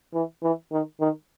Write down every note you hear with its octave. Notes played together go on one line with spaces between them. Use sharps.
E3
E3
D#3
D#3